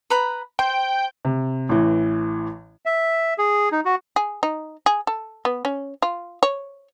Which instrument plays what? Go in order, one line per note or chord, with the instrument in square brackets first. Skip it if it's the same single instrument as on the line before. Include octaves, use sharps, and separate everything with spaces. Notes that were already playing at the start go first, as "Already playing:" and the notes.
[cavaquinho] B4 A#5 B5
[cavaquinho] C5 [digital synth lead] G5
[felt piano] C3
A1 E3
[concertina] E5
G#4
D#4
F#4
[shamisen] G#4
D#4
G#4
A4
B3
C#4
F4
C#5